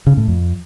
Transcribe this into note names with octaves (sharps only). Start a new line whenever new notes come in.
C#3
A2
F2